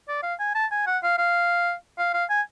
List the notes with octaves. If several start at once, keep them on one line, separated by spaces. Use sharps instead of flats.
D5
F5
G#5
A5
G#5
F#5
F5
F5
F5
F5
G#5